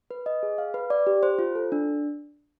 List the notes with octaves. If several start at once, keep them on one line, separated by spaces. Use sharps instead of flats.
B4
D#5
G#4
F5
B4
D5
G4
C5
F4
A4
D4